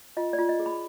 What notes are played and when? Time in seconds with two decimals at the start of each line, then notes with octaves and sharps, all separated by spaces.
0.17 F4 D#5
0.33 D5
0.38 F4
0.49 D#5
0.59 G#4
0.66 B5